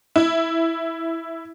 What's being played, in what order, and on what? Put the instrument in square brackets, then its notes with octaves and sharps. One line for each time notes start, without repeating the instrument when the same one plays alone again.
[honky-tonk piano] E4